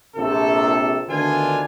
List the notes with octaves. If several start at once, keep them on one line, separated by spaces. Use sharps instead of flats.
A#1 C3 A4
D2 D#3 B3 D4 F4 G#5